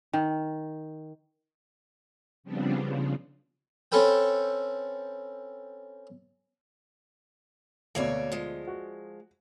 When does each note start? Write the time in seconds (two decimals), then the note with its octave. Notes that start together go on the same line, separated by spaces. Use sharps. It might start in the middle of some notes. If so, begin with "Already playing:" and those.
0.13 D#3
2.43 C#3 F3 G3 B3 C4 D4
2.85 C#3 F3
3.92 C4 C#4 A4 B4 G5
7.95 D2 B2 A#3 C#5 D5
8.32 F3 G#3
8.67 F#4